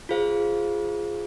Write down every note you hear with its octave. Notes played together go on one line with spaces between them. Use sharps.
F4 G#4 C5 F5